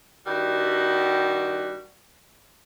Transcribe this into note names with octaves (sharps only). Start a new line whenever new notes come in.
G2 D#3 G3 F#4